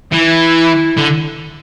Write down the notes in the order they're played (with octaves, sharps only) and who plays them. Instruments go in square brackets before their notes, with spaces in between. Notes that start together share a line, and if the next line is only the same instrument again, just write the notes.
[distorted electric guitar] E3 [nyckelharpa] E4
[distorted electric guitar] D3